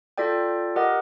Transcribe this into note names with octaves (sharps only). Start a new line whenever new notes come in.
F4 A4 D5 G5
G4 A#4 D#5 F#5